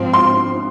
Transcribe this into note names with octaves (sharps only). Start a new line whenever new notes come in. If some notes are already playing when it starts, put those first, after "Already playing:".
Already playing: G#2 F3 C4
C6